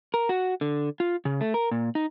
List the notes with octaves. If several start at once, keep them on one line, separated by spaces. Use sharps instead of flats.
A#4
F#4
D3
F4
C#3
A3
A#4
A#2
D#4